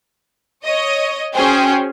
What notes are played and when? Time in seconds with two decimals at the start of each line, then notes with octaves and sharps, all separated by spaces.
0.64 C#5 D#5
1.33 C#4 F#4 G#4 C5 G5 G#5